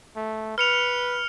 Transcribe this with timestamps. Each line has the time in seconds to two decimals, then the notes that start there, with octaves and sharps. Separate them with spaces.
0.16 A3
0.58 B4 F6 C#7 F7